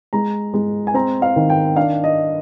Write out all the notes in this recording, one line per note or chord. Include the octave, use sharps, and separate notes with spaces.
G#3 A#5
G#3
G#5
C4 A#5
F5
D#3
G5
D4 F5
D#5